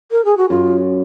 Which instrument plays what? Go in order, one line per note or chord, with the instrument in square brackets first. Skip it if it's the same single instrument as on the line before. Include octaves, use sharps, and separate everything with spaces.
[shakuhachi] A#4
G#4
F#4
[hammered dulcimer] F#2 [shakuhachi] F4